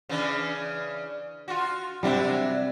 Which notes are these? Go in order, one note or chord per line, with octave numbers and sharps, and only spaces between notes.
C#3 E3 D4
F4 F#4
C3 F#3 G3 D4 E4